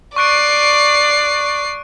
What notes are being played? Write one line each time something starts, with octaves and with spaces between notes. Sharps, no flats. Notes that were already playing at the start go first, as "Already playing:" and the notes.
D5 C#6 F#6 C7 D7